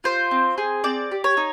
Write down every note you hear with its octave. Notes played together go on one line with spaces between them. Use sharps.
F4 C5
C4
G#4
C4 D5
G4
C#5
D#4